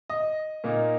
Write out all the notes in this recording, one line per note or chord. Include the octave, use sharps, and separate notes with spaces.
D#5
A#2 A#3 D#4